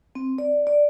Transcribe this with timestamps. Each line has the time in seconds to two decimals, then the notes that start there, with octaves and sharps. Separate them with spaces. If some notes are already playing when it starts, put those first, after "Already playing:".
0.15 C4
0.38 D5
0.67 D5